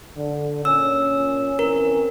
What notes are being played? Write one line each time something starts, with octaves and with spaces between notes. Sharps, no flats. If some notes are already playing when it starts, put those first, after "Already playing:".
D3
A#2 C#4 E6
E3 C4 C#4 A#4